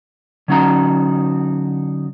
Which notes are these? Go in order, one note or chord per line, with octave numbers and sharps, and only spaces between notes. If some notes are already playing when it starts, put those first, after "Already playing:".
D3 F#3 C#4 D#4 F#4 A#5